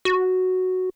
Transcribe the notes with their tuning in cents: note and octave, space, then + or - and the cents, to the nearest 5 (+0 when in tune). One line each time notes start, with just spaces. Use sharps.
F#4 +0